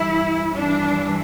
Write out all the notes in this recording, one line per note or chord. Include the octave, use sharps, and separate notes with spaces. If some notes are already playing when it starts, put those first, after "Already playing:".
Already playing: G2 E3 E4
G2 E3 D4